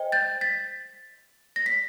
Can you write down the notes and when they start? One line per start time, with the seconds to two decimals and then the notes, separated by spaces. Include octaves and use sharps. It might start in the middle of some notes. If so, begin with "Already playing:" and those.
Already playing: C5 D#5 G5
0.12 G6 A6
0.41 A6 B6
1.56 A#6
1.66 B6